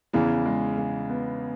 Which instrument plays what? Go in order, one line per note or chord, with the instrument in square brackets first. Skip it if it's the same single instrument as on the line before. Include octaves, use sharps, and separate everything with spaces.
[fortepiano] E2 E3 [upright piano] C#3
[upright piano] G#3
C#3
B3